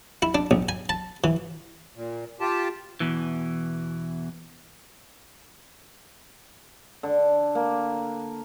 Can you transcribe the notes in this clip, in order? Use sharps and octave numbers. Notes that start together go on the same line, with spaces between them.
E4
D4
A#1
G#5
A5
E3
A#2
F4 G4 A5
E2 B2 E3
D3
A#3